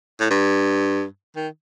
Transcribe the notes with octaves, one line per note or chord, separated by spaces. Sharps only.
A2
G2
D#3